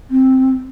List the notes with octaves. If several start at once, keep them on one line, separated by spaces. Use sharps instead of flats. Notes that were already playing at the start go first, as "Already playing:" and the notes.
C4